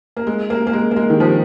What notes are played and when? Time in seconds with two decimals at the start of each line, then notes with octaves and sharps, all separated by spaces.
0.17 A#3
0.27 G#3
0.50 A#3
0.67 A#3
0.73 G#3
0.91 A#3
0.96 G#3
1.10 D#3
1.20 F3